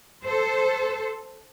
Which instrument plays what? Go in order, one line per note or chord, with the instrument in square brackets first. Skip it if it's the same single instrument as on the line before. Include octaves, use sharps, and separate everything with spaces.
[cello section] A4 C5